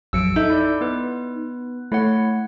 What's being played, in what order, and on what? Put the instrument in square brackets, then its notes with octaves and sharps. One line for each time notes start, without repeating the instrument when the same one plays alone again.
[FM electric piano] A1 F2 F#3 [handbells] E6 C#7 D7
[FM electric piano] D#4 [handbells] A4 E5 G6
[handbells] E4 D5
B3 B4
[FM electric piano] A3 [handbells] E4 C#5 F#5